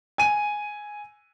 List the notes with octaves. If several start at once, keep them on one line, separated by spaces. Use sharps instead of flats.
G#5 D#7